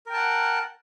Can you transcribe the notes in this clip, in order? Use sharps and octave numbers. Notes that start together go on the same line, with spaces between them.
A#4 F#5 G5 A5